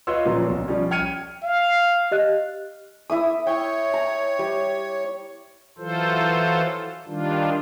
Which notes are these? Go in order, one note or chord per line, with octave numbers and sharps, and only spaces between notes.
F4 B4 C#5 D#5 C6 E6
A#2 C#3 F3 F#3
B1
F3 G3 C#4
G5 F6 G#6 C#7 D#7
F5
G4 D#5 F#6
E4 E5 D#6
C#5 G5
A#5
G3
E3 F#3 F4 A4 C5
D#3 G3 D4 F4